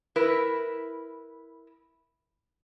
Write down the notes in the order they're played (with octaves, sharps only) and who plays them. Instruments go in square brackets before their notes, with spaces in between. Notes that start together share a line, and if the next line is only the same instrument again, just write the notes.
[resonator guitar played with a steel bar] E4 A#4 B4